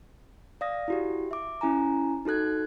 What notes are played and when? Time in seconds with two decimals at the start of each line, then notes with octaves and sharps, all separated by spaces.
0.61 D5 F5 D#6 A#6
0.88 E4 F#4 G4
1.31 E5 D6
1.61 C#4 E4 G#5 A#5
2.25 D#4 F#4 A4 F#6 G#6